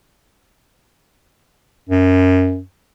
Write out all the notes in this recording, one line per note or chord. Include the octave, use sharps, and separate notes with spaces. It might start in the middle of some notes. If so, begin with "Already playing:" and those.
F#2